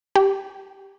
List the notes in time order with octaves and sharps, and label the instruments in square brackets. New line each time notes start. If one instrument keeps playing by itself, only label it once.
[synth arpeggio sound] G4